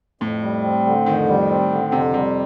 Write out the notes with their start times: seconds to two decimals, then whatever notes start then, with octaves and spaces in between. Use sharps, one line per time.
0.21 F2 A2
0.43 G3
0.64 C4
0.86 D3
1.06 F2 D#3
1.29 G3
1.50 C4
1.71 D3
1.92 F2 C3
2.14 C3 G3